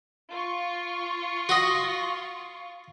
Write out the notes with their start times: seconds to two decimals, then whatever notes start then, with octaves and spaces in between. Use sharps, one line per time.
0.31 F4 C#6
1.49 F#4 D#5